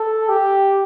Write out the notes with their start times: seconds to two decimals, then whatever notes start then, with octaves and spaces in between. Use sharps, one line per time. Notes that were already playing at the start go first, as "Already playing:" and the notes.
Already playing: A4
0.29 G4